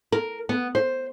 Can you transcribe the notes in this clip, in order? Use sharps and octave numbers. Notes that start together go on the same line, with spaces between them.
A#4
B3
C5